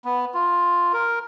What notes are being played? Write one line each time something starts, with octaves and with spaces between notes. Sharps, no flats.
B3
F4
A#4